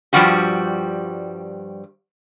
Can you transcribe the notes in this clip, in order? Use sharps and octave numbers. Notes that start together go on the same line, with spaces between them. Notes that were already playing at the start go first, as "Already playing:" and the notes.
G2 A#2 F3 G3 F#4 G4